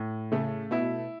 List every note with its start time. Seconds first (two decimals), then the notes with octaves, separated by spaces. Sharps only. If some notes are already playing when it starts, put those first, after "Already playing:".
Already playing: A2
0.32 C#3 A3
0.71 B2 E4